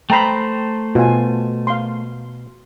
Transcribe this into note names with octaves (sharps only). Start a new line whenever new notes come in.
A3 C5 G5 A#5 B5
B2 F4 G#5
F5 C6